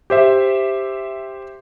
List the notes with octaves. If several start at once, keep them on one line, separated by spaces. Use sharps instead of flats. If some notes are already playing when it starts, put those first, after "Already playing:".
G4 C5 E5